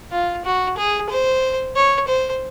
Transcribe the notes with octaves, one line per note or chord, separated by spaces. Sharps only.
F4
F#4
G#4
C5
C#5
C5